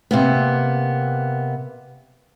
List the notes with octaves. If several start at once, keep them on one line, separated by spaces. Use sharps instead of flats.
C3 A#3 B3